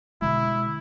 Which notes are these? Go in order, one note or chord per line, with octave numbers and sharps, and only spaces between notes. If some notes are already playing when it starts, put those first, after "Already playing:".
B2 D3 G#3 E4